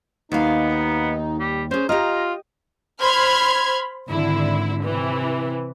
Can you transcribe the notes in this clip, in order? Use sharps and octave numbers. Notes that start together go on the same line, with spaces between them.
D#2 B3 D#4 F5
G3
C#4 G#4 C5
F4 G4 D#5 A#5
C5 B5 C6 F6 G#6
G#1 D3 E4
C3 E3